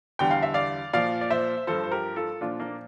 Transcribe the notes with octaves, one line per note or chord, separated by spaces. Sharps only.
E2 D3 G3 G5
F5
E5
D5 F5
A#2 F3 D5 F5
D5
C5 E5
G2 F3 A4 C5
C5
G4 A#4
F4 A4
A#2 F3 D4 F4
A#3 D4